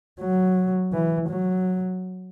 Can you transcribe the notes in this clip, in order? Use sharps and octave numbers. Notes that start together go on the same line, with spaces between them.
F#3
E3
F#3